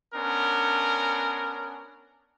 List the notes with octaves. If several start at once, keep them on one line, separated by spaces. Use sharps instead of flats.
B3 C#4 D4 A#4